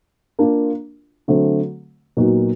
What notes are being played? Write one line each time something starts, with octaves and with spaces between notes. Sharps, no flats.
A#3 D4 F4
D3 F#3 A3 C4
A#2 F#3 B3 D#4 F#4